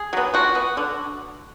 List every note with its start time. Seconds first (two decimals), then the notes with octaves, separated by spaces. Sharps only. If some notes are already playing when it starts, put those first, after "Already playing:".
Already playing: G#4
0.13 F#3 B3
0.34 F3 F#4
0.55 B3
0.77 D3